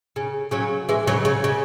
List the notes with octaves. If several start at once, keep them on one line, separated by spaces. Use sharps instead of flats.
C#3
C#3 F#3
E3 G#3
C#3 F#3
C#3
C#3